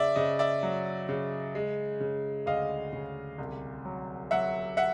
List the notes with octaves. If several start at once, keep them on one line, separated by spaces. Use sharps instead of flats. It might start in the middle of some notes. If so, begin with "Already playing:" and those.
Already playing: C#3 D5 E5
C#3 D#5
D5 E5
F#3
C#3
G#3
C#3
D2 D#5 F5
C#3
C2
F#3
F#3 E5 F#5
E5 F#5